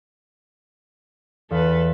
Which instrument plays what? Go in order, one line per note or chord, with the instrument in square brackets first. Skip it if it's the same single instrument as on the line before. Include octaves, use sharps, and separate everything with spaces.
[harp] E2 F5 [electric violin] A4 B4